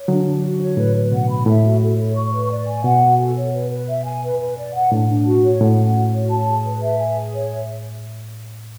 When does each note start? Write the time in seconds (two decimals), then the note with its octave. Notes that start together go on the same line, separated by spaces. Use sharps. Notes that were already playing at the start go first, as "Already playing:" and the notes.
Already playing: C#5
0.08 D3 F#3 D4
0.26 D4
0.43 F#4
0.60 C#5
0.77 A2 B4
0.95 B4
1.12 B2 F#5
1.29 B5
1.46 A2 E5
1.64 F#4
1.81 A4
1.99 C#5
2.16 C#6
2.33 B4
2.50 D5
2.67 G#5
2.84 B2 F#5
3.02 F#4
3.19 A4
3.36 C#5
3.54 B4
3.71 B4
3.88 E5
4.05 G#5
4.23 B4
4.40 B4
4.58 D5
4.74 F#5
4.92 A2 D4
5.09 D4
5.26 F#4
5.44 C#5
5.61 A2 F#5
5.78 C#4
5.95 F#4
6.13 C#5
6.30 A5
6.48 G#4
6.65 B4
6.82 E5
6.99 G#5
7.16 G#4
7.33 C#5
7.51 E5